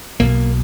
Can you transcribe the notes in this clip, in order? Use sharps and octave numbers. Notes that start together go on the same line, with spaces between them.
B1 B2 A#3